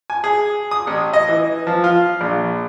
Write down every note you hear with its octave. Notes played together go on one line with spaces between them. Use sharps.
G#5
G#4
D#6
A1
D#5
E3
F3
F4
A#1